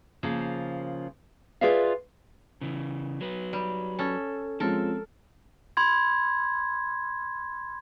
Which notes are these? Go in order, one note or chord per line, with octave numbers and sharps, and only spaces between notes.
C#3 F3 A#3
F4 G#4 B4 D5 E5 F5
C#3 E3
F#3 B4
G3
C#4 A4
F3 G#3 C4 C#4 A4 A#4
B5 C6 G#6